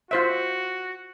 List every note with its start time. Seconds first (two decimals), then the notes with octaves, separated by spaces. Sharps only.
0.11 F4 F#4 C5 E5